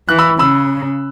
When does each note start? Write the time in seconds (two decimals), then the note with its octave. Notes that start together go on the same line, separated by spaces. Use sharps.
0.08 E3 F#6
0.19 B5 E6
0.39 C#3 B5 E6